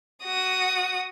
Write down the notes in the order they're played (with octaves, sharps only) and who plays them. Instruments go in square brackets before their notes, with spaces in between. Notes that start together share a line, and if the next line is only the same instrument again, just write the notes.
[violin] F#4 D#6